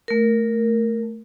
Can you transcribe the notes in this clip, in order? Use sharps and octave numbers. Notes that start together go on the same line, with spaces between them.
A3 A#4